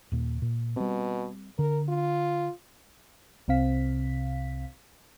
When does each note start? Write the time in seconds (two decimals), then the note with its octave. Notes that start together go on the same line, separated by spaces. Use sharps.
0.12 D#2 A#2
0.42 A#2
0.77 B2 G3 C4
1.59 D3 A#4
1.89 F4
3.48 C2 C3 C4 F5 B6